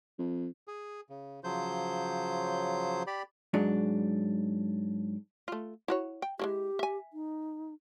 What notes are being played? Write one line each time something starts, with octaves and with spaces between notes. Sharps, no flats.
F2
G#4
C#3
C#3 F3 F#3 C5 G6
G4 D5 B5
G#2 F#3 D4
A3 F4
E4 F#4 C#5
G5
G#3 A#3 E4 G4
E5 G#5
D#4